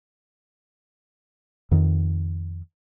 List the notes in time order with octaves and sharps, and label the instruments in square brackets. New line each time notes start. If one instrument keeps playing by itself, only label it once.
[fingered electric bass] F2 D#3